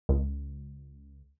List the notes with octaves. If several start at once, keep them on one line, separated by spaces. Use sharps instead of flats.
C#2